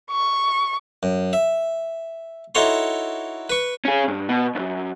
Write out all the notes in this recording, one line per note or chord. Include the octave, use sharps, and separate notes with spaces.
C#6
F#2
E5
D#4 E4 F#4 A4 C#5 C6
B4 C#6
C#4 G#4
G2
B2
B1 F#2